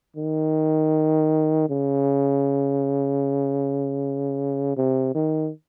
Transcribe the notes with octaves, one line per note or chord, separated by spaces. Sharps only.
D#3
C#3
C3
D#3